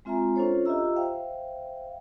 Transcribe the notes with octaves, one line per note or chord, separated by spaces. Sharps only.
G#3 C4 F4 E5 G#5 A#5
C#4 D4 F4 A4 C5 C#5
F4 G4 D#5 E5 A#5 E6
C5 E5 F5 G5